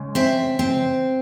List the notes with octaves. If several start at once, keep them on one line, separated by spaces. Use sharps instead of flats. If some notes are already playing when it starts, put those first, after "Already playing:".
Already playing: C#3 G#3
C4 E5
C4